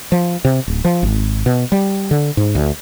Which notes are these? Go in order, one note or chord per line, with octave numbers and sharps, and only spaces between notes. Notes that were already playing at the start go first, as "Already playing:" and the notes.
F3
C3
D1
F3
G#1
B2
G3
D3
G#2
D2